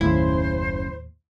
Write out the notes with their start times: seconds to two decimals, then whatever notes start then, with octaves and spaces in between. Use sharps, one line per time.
0.01 F#1 D#2 A2 C#3 E4 C5